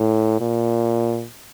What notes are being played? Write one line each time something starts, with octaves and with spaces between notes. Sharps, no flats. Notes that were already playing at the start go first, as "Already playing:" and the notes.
Already playing: A2
A#2